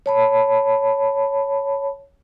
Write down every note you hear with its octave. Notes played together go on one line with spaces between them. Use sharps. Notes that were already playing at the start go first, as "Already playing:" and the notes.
C#5 A5 B5